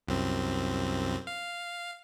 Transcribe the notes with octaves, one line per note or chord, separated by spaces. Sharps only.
C2 F#2 C4
F5